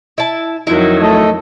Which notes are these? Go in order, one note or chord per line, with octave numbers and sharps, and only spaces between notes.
E4 A5
F2 D#3 F#3 E4
A3 A4 D#5